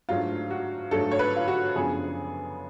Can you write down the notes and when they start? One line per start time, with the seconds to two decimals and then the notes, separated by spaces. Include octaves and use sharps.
0.09 G#2 F#3 A3 D4 F4
0.50 F#4
0.91 G#2 F#3 A3 D4 A4
1.11 C#5
1.19 B4
1.36 F4
1.48 F#4
1.75 F#2 C#3 F3 B3 D4 G#4